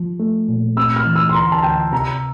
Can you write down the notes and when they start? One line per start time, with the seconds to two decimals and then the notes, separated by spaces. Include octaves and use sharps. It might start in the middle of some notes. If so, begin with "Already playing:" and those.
Already playing: F3
0.20 A3
0.49 A#2
0.77 C4 E6
0.96 F6
1.06 E3
1.16 E6
1.29 C6
1.34 D2 A#5
1.52 A5
1.63 D2 G5
1.93 C3 A#5